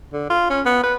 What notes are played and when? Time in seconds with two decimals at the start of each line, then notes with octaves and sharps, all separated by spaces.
0.13 D3
0.30 F4
0.50 C#4
0.66 B3
0.83 B4